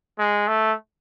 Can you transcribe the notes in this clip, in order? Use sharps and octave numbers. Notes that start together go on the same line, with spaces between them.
G#3
A3